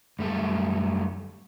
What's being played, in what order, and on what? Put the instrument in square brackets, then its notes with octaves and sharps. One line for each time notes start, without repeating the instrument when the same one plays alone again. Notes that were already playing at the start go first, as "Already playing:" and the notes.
[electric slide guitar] F#2 G3 A3 A4